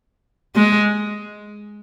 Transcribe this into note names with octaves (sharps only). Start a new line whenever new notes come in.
G#3